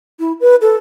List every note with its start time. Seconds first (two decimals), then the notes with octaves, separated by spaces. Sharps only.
0.20 E4
0.41 B4
0.61 A4